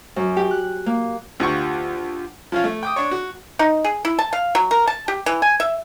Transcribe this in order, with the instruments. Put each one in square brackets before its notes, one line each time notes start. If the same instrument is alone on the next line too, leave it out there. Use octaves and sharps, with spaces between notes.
[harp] F#2
G4
F#6
A#3
[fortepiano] D2 C#6 [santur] F4 G4 F#5
[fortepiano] F3 C#4 F4
A3
G5 D6 D#6
D4 C#5
F#4
[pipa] D#4
G#4
E4
A5
F5
F#3
A#4
A5
G4
E3
G#5
E5